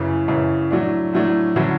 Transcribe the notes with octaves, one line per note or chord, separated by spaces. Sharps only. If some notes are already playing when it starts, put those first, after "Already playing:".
Already playing: F#2 C#3 E3
F#2 C#3 E3
A2 F#3 A3 D4
A2 F#3 A3 D4
D3 F#3 C#4 E4